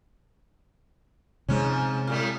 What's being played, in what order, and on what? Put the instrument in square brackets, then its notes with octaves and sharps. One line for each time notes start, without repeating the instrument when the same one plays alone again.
[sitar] G#2 F3 C#4 [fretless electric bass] C3 G#3
[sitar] A2 G3 A3